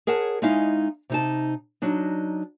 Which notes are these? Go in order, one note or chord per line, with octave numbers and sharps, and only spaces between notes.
G#4 A#4 C#5 F#5 A5
G#3 C#4 D#4 E4 F5
C3 D#4 A5
F#3 D4 D#4